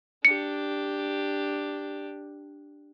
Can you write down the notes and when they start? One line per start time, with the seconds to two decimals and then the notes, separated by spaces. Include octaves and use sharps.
0.25 D4 G4 C#7